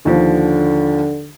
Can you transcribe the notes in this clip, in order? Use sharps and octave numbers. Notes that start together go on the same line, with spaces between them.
D#2 D3 F3